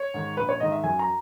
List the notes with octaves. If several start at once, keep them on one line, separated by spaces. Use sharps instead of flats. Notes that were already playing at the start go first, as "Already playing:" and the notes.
Already playing: C#5
G#2 D#3
A#1 B4
C#5
G#2 D#3 D#5
E5
F#2 G#5
A#5